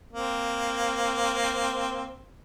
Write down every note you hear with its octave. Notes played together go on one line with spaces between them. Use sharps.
A#3 C4